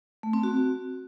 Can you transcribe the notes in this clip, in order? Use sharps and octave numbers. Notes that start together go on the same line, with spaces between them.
A3
C4
F#4